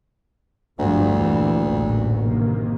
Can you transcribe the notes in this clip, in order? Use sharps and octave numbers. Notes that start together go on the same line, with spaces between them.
G1 D2 G2 F3 A3
A#1 E2 A#2 E3
A1 F#2
C3 D#3 A#3